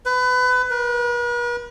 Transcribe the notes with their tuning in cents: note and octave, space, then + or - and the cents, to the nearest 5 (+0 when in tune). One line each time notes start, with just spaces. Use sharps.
B4 +25
B4 -45